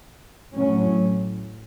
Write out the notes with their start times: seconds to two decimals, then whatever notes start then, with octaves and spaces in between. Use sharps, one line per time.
0.55 A2 F#3 C#4